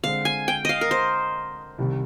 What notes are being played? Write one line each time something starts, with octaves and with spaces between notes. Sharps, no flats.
D3 G#3 C4 F5
G#5
G5
D#5 F5
A#4
C5
C2 C3 D#3 G3